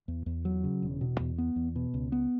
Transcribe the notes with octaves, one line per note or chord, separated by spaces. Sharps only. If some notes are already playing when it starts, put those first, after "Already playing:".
E2
E2
F#3
C#3
E1
B2
E2
B3
E2
B2
C#2
B3